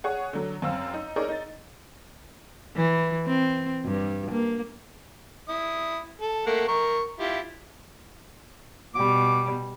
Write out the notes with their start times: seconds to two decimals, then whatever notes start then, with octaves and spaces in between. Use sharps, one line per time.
0.04 G#4 C#5 F#5
0.33 D3 F#3
0.62 F#2 C4 F5 E6
0.94 D#4
1.16 D#4 G#4 A#4 C#5 D5
1.29 D#4 A6
2.76 E3
3.26 C4
3.84 G2
4.31 A#3
5.49 E4 D#6
6.21 A4
6.47 A3 A#3 F#5
6.68 A#4 C#6
7.20 E4 F4 G4
8.95 B2 G3 D6